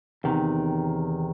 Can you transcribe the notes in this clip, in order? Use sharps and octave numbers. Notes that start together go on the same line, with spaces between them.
E2 C3 D#3